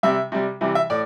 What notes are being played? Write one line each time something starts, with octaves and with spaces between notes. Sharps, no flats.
C3 G3 E5
C3 G3
C3 E3 G3
E5
A2 D5